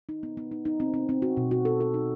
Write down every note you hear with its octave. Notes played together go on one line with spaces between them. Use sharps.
D#4
B3
B3
D#4
D#4
C4
C4
C4
F#4
B2
F#4
A4
A4
D#4